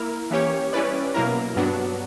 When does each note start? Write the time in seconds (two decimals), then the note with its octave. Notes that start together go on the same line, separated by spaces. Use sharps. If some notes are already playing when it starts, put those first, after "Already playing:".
Already playing: A#3 E4 A#4
0.31 E3 A#3 C#4 G4 C#5
0.73 G3 C#4 E4 B4 D5
1.14 B2 F#3 A#3 E4 A#4
1.56 G2 F#3 B3 D4 F#4